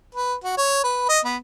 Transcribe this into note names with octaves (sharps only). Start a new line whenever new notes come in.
B4
F#4
C#5
B4
D#5
B3